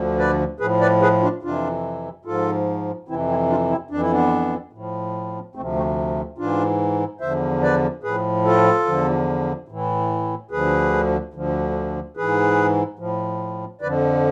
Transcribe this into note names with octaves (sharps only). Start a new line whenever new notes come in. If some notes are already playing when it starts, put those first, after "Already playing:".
Already playing: D2 D3 F3
B4 D5
A2 F3 G#4 B4
B4 D5
G#4 B4
D4 F4
F2 C3 E3 D4 F4
G#2 F3 F4 A4
F2 C3 E3 C4 E4
C4 E4
D4 F4
C4 E4
F2 E3 D4
E4
B3 D4
A2
F3
D2 C3 F3 A3 C4
A3 C4
G#2 E3 D4 F4
E2 D3 F3 C5 E5
B4 D5
A2 F3 G#4 B4
F4 A4
E2 D3 F3
A2 E3
D2 D3 F3 G#4 B4
D2 D3 F3
G#2 E3 G#4 B4
A2 F3
F2 D3 F3 B4 D5